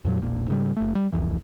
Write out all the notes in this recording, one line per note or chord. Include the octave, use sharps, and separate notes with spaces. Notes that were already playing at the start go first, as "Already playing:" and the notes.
F2 A#2 F#3
E1 A#1 A#2
G#2 C#3 G3
F#1 A3
G3
D1 C2 F2 E3